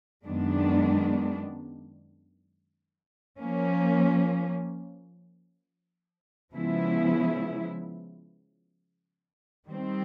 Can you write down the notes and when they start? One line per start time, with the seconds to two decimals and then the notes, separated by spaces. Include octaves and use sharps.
0.25 F#2 D#3 G#3 B3 D4
3.39 F3 A#3 C#4
6.53 C#3 F3 G#3 B3 E4
9.67 D#3 G3 C4